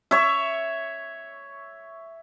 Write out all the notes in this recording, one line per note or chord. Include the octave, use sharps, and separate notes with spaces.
C#5 E5